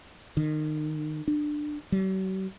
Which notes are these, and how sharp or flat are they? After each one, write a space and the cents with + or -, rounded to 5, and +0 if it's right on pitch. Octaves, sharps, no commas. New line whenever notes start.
D#3 -25
D4 +20
F#3 +45